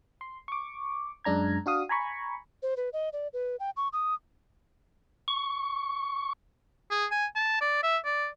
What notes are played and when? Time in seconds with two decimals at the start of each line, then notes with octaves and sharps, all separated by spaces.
0.21 C6
0.48 C#6 D6
1.24 F#2 G#3 D4 A#5 G#6
1.66 D4 F#4 F5 D#6
1.89 G#5 A#5 B5 C#6
2.63 C5
2.77 B4
2.93 D#5
3.13 D5
3.33 B4
3.60 G5
3.77 C#6
3.93 D#6
5.28 C#6
6.91 G#4
7.11 G#5
7.36 A5
7.61 D5
7.83 E5
8.05 D5